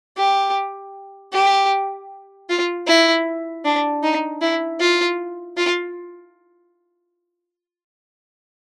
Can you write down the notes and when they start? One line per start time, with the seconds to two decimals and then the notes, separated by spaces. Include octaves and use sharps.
0.17 G4
1.33 G4
2.49 F4
2.87 E4
3.65 D4
4.03 D#4
4.42 E4
4.80 F4
5.57 F4